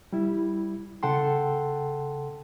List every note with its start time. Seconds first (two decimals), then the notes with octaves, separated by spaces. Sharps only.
0.13 G3 E4
1.03 C#3 A4 F#5 G5 A5 C6